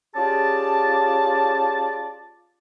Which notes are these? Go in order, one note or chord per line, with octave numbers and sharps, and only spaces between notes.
C#4 F4 G4 G#4 D5 A5